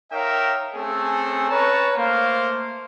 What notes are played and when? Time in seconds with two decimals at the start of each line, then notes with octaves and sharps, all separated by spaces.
0.12 D#4 A#4 C#5 E5 F5 G5
0.75 A3 C4 C#4 G#4 A4
1.50 C#4 B4 C#5 A5 A#5
1.97 A3 A#3 C5 F5